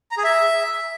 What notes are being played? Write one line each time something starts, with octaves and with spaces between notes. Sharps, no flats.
A#5
G#4
E5